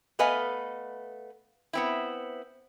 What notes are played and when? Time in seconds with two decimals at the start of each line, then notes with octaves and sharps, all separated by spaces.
0.19 A3 B3 B4 D#5 F5 G#5
1.73 B3 C4 E4